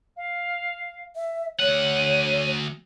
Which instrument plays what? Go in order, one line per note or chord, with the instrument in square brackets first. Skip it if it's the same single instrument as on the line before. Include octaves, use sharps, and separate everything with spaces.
[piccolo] F5
[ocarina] E5
[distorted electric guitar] D2 F#5 [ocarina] C#5 [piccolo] D#7